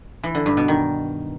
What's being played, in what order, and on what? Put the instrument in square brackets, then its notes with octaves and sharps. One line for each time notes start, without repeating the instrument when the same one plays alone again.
[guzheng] E3
D3
G2
B2
D#3